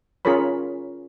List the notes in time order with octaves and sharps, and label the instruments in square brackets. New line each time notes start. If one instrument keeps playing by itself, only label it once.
[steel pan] C#4 F4 G#4 A#4 C#5 B5